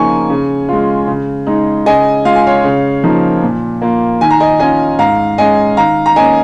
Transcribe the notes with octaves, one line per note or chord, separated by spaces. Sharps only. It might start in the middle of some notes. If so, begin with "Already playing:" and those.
Already playing: C#3 F3 A#3 D#4 G#5 C#6
C#3
G#3 F4
C#3
G#3 D#4
C#3 D#5 G#5
G#3 F4 F5
G#5
C#5 F5
C#3
F3 A#3 D#4
A#2
A#3 F4
D#3 G#5
A#5
D#5 G#5
C#4 F4 D#5 G#5
G#2 F5 A#5
G#3 C#4 D#5 G#5
D#3 F5 A#5
A#5
A#3 C#4 D#5 G#5